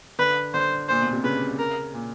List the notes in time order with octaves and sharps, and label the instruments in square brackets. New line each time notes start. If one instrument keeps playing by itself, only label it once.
[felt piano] D3 [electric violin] B4
[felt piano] D3 [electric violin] C5
[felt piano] A#2 [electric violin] C5
[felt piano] B2
C3
[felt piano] C#3 [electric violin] B4
[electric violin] A#4
[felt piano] A#2